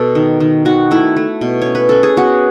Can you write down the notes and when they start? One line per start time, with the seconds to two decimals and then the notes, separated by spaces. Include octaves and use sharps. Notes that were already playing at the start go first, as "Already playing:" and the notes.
Already playing: B2 A4 B4
0.15 D#3
0.40 D#3
0.65 D#3 F#4
0.91 A3 E4
1.16 A3
1.41 B2
1.62 C#4 C#5
1.75 B4
1.89 C#4 A4
2.03 G#4
2.17 B3 F#4